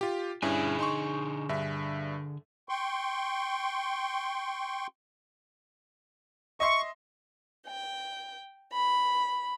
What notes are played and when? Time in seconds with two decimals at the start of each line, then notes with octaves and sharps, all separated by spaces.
0.01 F4 G4
0.42 G2 D3 C#4 E4 G#4 G#5
0.79 D#4 C6 C#6
1.49 G2 E5
2.69 G5 C6 C#6
6.60 D#5 E5 C6 C#6
7.67 G5
8.72 B5